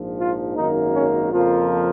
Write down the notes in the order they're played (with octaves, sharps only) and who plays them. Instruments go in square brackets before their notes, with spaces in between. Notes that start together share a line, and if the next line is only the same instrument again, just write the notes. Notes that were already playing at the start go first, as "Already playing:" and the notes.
Already playing: [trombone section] A#1 G#2 F3
F4
G#1 F#2 D#3 A#3 D#4
C#4
F2 C#3 F3 A#3 F4